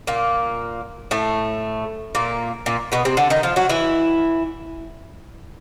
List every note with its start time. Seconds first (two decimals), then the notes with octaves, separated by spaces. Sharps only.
0.07 A#2 A#3
1.11 A2 A3
2.15 A#2 A#3
2.66 A#2 A#3
2.92 B2 B3
3.05 C3 C4
3.17 D3 D4
3.30 D#3 D#4
3.43 F3 F4
3.56 F#3 F#4
3.69 E3 E4